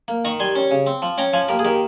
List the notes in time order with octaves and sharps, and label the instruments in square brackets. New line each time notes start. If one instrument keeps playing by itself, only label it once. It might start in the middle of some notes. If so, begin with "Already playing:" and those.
[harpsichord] A#3
D#3 A#5 C#6
G3 G#5 C6
C#4
C#3
C4
F3
C#4 G5 A#5
F3 F5 G#5
A#3 G4 A#4
G#4
D#3 G4 A#4